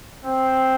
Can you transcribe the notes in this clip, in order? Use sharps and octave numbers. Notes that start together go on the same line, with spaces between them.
C4